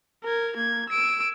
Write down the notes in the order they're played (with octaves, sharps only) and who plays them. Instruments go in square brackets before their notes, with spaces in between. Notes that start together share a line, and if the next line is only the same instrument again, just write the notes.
[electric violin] A#4 G#6
A#3 G#6
E6 D7